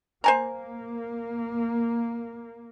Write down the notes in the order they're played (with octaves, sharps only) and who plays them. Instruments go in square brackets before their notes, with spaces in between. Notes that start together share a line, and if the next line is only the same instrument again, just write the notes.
[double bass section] A#3 [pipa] C5 G#5 A#5